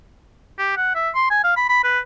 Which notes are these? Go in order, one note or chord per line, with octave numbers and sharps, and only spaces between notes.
G4
F#5
E5
C6
G#5
F5
B5
B5
B4